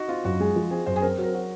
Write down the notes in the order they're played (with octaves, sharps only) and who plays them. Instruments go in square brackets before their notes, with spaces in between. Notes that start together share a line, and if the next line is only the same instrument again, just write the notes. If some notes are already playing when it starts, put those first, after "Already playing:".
Already playing: [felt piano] D#4 F#4
[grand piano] C4 [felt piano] F4
[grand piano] F#2 [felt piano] F#4
[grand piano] G#3 [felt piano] G#4
[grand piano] F3
[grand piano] C4 [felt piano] G#4
[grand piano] F#2 [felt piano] C5
[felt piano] G#4
[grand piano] C4 [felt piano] A#4
[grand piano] F#3
[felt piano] A#4
[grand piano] F#4